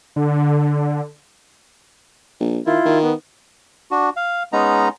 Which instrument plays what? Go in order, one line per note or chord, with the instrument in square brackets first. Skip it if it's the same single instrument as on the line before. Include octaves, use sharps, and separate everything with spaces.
[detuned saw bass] D3
[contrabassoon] A#1
[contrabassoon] D#3 [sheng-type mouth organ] E4 F4
[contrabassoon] D#3
[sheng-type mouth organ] B3
[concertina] D4 F#4
F5
G#3 B3 C#4 D#4 A#5